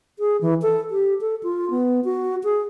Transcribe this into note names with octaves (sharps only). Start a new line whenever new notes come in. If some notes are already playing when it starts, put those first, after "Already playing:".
G#4
E3
A4
G4
A4
F4
B3
F#4
G#4